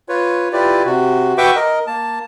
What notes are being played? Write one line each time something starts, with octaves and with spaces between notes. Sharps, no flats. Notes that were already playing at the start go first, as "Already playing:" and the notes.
F4 B4 C#5
E4 F4 G4 B4 D5
C3 F#4
F#4 B4 E5 G5 C#6 D6
A#4 D#5
A#3 A5